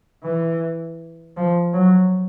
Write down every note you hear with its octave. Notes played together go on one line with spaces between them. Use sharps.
E3
F3
F#3